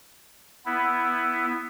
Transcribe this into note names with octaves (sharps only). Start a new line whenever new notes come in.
B3 E4